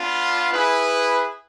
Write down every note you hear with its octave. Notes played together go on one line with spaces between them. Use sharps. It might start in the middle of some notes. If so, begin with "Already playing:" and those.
Already playing: B3 D4 F4
E4 G#4 B4